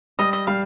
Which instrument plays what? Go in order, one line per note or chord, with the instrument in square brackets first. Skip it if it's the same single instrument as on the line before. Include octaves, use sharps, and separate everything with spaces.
[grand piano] G3 [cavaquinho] D#5
[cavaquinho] D#5
[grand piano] G3 [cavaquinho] F5